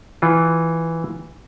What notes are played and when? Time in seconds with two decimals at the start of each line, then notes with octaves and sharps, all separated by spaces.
0.22 E3 F4